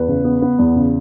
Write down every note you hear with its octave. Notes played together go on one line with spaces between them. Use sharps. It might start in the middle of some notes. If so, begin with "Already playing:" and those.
Already playing: E2 B4
C#3
B3
B3
E2
C#3